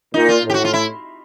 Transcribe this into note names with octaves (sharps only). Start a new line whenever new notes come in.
A#2 D#4
F4
A2 G4
F#4
F4
E4